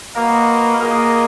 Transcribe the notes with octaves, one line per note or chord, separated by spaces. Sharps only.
A#3 F#4 A#4 B4 D#5
A#3 F4 G#4 A#4 D#5